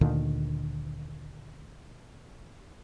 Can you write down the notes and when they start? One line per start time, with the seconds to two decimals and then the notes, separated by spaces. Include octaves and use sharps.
0.01 D2 A#2 D3 D#3